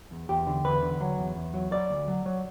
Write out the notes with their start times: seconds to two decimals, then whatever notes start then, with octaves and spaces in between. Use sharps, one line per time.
0.11 E2
0.29 E2 G4
0.47 D3
0.65 E2 B4
0.82 D3
1.01 F#3
1.18 E2
1.36 E2
1.54 F#3
1.72 F#3 D5
1.90 D2
2.08 F#3
2.26 F#3